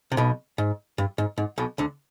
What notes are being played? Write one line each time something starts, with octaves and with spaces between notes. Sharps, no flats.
C3
B1 B2
G#2
G2
G#2
G#2
B1 B2
D2 D3